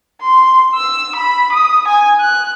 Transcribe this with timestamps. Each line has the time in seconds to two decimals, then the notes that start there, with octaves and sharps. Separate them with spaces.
0.21 C6
0.74 E6
1.16 B5
1.52 D#6
1.88 G#5
2.20 F#6